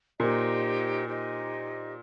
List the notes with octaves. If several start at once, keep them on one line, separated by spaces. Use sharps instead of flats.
A#2 D#4 G4 C5 D#5
D#4 G4 C5 D#5